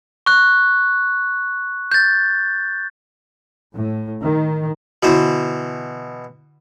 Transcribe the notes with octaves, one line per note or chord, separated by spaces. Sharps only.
C#6 F#6
G6 A6
A2
D#3
B2 D3 E3 E4 F#4 C5